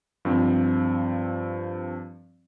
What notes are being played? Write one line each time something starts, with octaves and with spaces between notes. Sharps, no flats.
G2 F3 C4